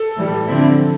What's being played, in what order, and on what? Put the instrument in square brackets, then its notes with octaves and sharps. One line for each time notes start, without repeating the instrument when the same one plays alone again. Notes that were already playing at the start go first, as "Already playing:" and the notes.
Already playing: [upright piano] A4
[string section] A2 E3 G3
D3 F3 C4 E4